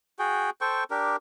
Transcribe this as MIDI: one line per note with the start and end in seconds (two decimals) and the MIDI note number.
0.19 0.50 66
0.19 0.50 68
0.19 0.50 79
0.61 0.84 69
0.61 0.84 72
0.61 0.84 79
0.61 0.84 85
0.91 1.16 62
0.91 1.16 67
0.91 1.16 70